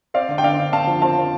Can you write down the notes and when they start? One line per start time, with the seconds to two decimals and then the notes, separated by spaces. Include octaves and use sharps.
0.14 C4 D5 F5
0.29 D3
0.38 G5
0.43 D3 D5 F5
0.58 D3
0.73 D3 F5 A5
0.87 F3
1.02 C4 F5 A5
1.17 C4